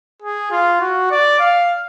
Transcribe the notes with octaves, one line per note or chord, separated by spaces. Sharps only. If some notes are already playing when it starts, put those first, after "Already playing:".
G#4
F4
F#4
D5
F5